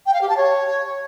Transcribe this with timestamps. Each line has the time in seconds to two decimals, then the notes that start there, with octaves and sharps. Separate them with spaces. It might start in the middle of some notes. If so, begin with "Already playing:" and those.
0.06 G5
0.14 F5
0.21 G4
0.29 A5
0.37 C#5